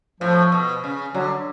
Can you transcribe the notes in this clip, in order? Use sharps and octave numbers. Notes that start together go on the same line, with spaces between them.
A2 F3
B2
C#3
D3 F#3